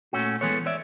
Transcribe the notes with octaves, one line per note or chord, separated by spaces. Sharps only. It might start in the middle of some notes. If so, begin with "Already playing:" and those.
A#2 A3 C#4 F#4
E3 G#3 B3 A4 C#5
C#5 D5 E5